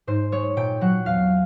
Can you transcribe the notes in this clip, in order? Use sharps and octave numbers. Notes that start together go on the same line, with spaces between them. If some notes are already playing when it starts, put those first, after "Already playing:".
G#2 C5
G#3 C#5
A#2 G5
F#3 F#5
E2 F5